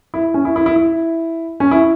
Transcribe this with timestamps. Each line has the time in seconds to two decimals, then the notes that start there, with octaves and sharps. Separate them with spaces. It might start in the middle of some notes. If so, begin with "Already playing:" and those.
0.14 E4
0.34 C#4
0.45 E4
0.56 E4
0.66 E4
0.76 E4
1.60 C#4
1.71 E4